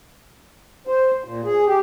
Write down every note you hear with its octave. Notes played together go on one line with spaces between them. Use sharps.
C5
A#2
G#4
G4